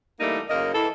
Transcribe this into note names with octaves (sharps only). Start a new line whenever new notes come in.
E3 G3 A3 A#3 D#4
F#2 C#3 A#3 D#5
E3 A4